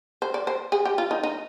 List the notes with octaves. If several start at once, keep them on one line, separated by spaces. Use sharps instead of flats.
C5
D5
C5
G#4
G4
F4
D#4
D#4